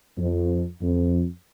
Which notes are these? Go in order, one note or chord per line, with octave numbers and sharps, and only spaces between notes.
F2
F2